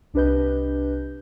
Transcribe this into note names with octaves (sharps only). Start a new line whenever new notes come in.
C2 D4 G4 B4 D#5 G6